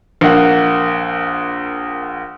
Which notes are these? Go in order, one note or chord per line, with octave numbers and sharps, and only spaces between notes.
A#1 A#3 F#5